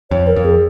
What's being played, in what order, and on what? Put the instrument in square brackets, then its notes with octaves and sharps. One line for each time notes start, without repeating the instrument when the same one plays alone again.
[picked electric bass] F2 [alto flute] C#5
[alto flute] A#4
[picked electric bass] F2
[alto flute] G#4